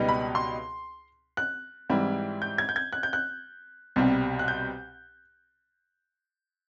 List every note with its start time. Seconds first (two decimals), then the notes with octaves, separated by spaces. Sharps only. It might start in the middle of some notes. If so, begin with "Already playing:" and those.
Already playing: C#2 B2 G3 B3 D#4
0.09 B5
0.35 C6
1.37 F#6
1.90 G#2 E3 G3 C4 E4
2.42 G6
2.58 G#6
2.69 G6
2.76 G#6
2.93 F#6
3.03 G6
3.13 F#6
3.96 C2 B2 G3 C4
4.39 F#6
4.48 G6